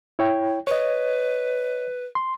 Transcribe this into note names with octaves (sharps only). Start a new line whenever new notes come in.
E4 C#5 G5
B4 C#5 D#5
C6